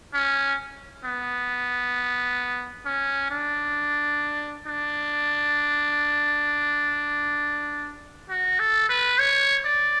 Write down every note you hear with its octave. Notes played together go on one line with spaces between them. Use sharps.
C#4
B3
C#4
D4
D4
F#4
A4
B4
C#5
D5